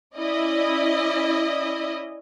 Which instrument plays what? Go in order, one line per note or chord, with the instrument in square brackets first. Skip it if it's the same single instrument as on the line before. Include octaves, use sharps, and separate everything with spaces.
[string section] C#4 E4 D5 D#5